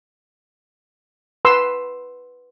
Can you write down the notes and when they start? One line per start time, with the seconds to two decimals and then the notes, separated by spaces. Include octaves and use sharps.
1.45 B4 C6 E6